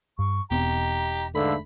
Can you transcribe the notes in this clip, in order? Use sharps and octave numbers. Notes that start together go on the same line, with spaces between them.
G2 C#6
E1 B3 C4 D#4 G4 D#5 A#5
G#2 D3 A3 B4 F5 B5 E6